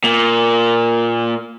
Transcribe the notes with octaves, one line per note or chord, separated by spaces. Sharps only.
A#2